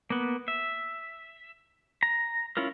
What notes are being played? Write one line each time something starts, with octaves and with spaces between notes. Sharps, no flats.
A#3 B3
E5
A#5
C#4 E4 F4 A#4